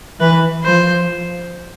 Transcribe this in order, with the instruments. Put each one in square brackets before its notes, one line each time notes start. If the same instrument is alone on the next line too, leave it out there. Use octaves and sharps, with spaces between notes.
[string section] E3 [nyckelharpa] B4
[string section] F3 [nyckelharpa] C5